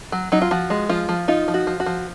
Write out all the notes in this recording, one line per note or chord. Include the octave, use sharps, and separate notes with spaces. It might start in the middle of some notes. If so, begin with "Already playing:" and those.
F#3
F#3 D#4
F4
F3 F#4
G#3
F3 F4
F3
D#4 F4
F3
F#4
F3
F#4
F3